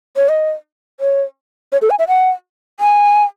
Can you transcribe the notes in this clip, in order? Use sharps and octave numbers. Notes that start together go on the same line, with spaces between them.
C#5
D#5
C#5
C#5
A4
G#5
E5
F#5
G#5